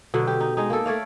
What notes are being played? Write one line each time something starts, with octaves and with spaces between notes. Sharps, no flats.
B2 D3 F#3
G4
D#4
G#3 D#4
A#3 A4
A3 C#5 D5 F5